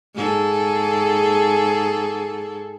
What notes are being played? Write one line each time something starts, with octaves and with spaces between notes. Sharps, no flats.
G#2 G#4 A4